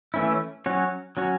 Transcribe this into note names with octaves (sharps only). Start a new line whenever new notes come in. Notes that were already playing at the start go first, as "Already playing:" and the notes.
E3 A3 C#4 E4
F#3 C#4 F#4 C#5
F#3 C#4 F#4 C#5